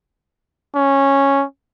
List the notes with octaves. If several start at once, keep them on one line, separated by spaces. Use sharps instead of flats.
C#4